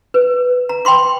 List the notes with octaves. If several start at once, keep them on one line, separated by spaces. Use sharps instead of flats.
B4
A#5
G5 B5 C6 D6